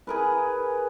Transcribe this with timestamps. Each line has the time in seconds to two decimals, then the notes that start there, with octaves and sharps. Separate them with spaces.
0.07 G#4 A#4 B4